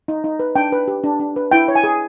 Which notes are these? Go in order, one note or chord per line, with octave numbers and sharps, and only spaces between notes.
D#4
D#4
B4
D4 G5
B4
G4
D4
D4
B4
E4 G5
C#5
G#5
G#4